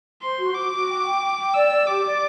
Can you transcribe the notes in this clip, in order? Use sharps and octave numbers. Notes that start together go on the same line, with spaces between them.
C5 C6
F#4
F#4 D6
F#4
G5
G5
G5
G5
D5 E6
D5
G4 D6
D5